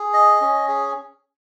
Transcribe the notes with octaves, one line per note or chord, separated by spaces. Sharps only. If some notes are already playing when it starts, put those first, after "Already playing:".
Already playing: G#4
D#5
C#4
G#4